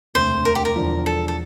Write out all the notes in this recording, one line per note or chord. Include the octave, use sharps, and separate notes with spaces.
E1 D2 C3 C5
A#4
G4
A#4
E1 E2 D3 F3
A4
A4